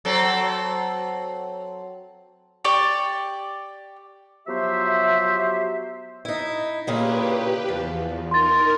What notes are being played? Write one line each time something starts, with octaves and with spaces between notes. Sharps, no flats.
F#3 C4 A4
G4 D5 C#6
F3 F#3 B3 G4 C5 E5
D#4 E4
A#2 C#3 E4 G4 B4
E2 F3
D#4 A#4 C6 A6